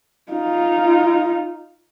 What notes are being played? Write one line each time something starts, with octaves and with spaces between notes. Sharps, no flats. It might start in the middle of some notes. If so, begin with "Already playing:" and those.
D#4 F4